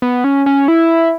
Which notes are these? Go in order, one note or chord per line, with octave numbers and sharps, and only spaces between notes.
B3
C#4
C#4
E4